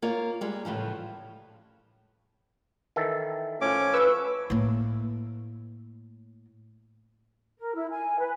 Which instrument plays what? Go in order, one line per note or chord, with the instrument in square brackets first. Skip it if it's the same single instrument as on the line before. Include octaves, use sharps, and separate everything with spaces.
[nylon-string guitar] A#3 F4 C#5
G3 G#3
A2 C#3 E3 F3
[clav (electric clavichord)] D#3 E3 A4
[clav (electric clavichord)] A2 F3 [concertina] C#4 D6
[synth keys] B4 C#6 E6
[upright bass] A2 A#3
[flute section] A#4
E4
G#5
B4